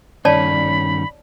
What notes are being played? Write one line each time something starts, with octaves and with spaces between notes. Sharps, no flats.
G2 D#3 C#4 C#5 D5 A5 B5